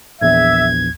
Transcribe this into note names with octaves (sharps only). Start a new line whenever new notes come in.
A#1 E2 E5 G#6